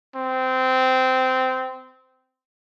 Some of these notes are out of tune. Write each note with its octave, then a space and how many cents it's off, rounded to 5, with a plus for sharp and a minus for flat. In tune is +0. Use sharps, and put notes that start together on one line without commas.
C4 -15